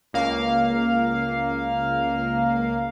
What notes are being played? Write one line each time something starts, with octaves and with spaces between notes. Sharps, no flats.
C#2 A#3 F5